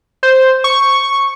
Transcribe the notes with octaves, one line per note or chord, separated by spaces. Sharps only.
C5
C#6